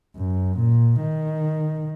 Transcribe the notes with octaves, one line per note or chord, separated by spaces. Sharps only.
F#2
A#2
D#3